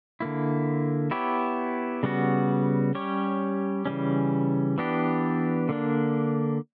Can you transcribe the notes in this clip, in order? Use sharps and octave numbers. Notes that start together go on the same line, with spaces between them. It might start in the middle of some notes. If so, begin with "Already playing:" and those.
D3 A#3 E4
B3 E4 G4 C#5
C#3 G3 B3 F#4
G3 C#4 G4 C#5
C#3 E3 G3 C#4
E3 B3 D4 G4
D3 A#3 D4